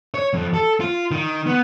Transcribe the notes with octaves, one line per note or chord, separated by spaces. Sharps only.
C#5
F2
A4
F4
D#3
B3